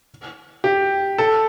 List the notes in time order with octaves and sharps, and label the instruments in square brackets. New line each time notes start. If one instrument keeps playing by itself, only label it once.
[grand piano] G4
A4